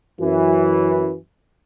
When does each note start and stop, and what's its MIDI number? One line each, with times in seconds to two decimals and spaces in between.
0.19 1.13 42
0.19 1.13 52